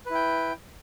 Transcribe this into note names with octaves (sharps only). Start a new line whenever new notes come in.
E4 B4 G5